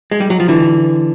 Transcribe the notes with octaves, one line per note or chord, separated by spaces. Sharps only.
G#3
G3
F#3
F3
D3 E3